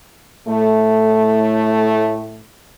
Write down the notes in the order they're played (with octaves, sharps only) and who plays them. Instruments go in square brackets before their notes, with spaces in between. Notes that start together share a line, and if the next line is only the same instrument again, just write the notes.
[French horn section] A2 A3